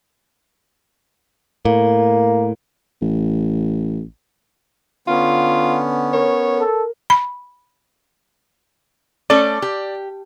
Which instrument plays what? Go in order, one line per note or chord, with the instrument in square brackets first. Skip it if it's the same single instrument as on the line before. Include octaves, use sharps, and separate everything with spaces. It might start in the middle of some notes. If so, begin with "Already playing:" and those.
[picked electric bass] A2 [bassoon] A#3
[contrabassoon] A1
[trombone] D3 [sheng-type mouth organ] B3 C#4 [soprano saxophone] F4 [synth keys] F6
[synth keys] A#4 [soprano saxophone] C#5
[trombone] A4
[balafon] B5
[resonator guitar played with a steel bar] A3 C#4 A4 [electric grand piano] D5
[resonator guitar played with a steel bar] G4